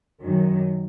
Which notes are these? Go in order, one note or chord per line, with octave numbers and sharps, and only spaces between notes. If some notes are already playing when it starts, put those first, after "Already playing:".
F#2 D#3 F#3